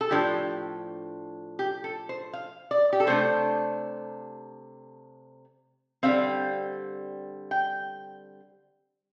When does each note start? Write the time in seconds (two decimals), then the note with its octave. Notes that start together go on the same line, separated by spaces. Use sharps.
0.01 A4
0.11 A2 F3 D4 G4
1.59 G4
1.84 A4
2.09 C5
2.33 F5
2.71 D5
2.93 G4
3.00 A4
3.07 C3 A3 D4 C5
6.03 D3 G3 C4 F5
7.51 G5